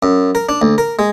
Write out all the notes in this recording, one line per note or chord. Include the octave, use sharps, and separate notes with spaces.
F#2
A#4
D4
D2
A#4
G#3